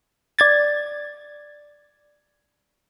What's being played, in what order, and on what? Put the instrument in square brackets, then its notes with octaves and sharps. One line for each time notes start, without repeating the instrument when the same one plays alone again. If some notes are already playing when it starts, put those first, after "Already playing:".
[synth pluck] D5 G#6 A6